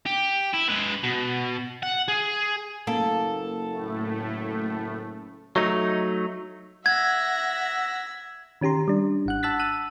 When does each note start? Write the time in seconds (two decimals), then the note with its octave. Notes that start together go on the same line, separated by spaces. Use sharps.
0.06 G4
0.54 E4
0.69 G#3 B4
1.03 B2
1.83 F#5
2.08 G#4
2.87 F#1 A#3 A4
3.70 A2 A3
5.56 F#3 A3 D#4
6.86 E5 F#5 E6 G#6 A#6
8.61 D#3 C#4 G4 A#5 C6
8.88 G3 D4
9.26 G#1 F#5 F#6
9.43 F#5 A5 E6 F#6 A6 B6
9.59 E6 F#6 D#7